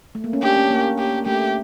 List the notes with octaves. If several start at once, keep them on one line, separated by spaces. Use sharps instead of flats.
A3
A#3
C#4
D4 G4
C#4
A#3
G4
A3 G4